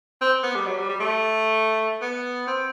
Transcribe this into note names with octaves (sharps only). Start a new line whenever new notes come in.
C4
B3
G3
F#3
G3
G3
A3
B3
C4